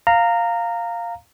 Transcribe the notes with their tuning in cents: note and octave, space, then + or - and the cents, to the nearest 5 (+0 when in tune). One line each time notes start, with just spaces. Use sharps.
F5 +0 A#5 -15